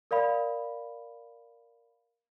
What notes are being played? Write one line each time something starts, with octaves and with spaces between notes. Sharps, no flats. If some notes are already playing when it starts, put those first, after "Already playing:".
A#4 D5 F5 B5